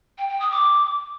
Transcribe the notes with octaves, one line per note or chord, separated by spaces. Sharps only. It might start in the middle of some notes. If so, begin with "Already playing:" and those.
G5
G5
D#6
D6